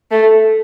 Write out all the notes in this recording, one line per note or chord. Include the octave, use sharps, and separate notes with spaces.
A3